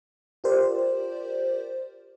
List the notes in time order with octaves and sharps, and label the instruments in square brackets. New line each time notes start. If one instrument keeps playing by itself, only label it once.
[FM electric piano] F4 G4 A#4 C5 D5